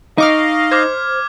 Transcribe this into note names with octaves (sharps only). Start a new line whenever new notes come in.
D#4 D#5 F5 C#6 D6 F6
C5 D6 F6 G#6